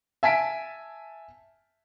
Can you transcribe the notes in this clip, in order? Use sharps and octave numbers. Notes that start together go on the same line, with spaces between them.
E5 G#5 A5 B6 D7